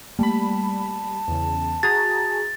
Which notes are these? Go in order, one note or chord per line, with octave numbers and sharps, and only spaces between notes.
G3 A3 A#3 A5 B5
E2 C#3
F#4 G#4 A#5 A6